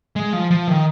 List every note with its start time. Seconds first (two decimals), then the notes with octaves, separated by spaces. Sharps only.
0.16 G#3
0.33 F3
0.51 F3
0.68 D#3